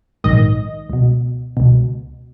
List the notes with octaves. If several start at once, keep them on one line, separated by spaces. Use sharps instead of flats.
A#1 G#2 D#3 D#5
C#2 B2
C#2 B2